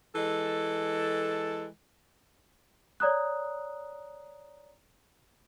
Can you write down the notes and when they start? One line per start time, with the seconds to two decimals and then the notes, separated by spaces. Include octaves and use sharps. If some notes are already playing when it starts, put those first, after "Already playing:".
0.15 E3 G#3 A4
3.00 C#5 D5 A#5 D#6 F#6